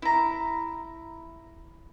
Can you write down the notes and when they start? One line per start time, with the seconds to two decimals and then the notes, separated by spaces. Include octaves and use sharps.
0.02 E4 A#5